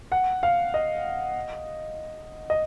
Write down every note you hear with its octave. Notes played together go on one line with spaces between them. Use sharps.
F#5
F5
D#5
D#5